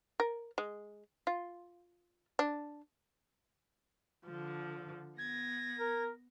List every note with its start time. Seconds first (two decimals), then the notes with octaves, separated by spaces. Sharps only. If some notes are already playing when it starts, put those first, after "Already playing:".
0.20 A#4
0.58 G#3
1.27 F4
2.39 D4
4.25 D3 F3
5.18 B3 G#6 A#6
5.79 A#4